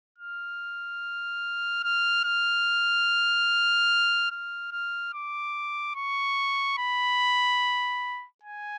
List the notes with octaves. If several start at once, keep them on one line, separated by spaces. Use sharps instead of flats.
F6
F6
F6
F6
F6
D6
C#6
B5
G#5